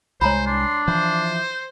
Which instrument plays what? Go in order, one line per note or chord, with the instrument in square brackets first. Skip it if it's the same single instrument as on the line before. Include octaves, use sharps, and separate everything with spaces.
[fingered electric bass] C2 E3 G#3 [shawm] C5 [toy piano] C#5 A#5 B5
[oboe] D4 [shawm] C6
[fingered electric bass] E3 F3 [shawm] C5